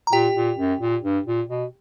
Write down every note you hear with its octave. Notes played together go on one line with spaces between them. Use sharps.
A#5
A#2 G4 G5
A#2
F#2
A#2
G2
A#2
B2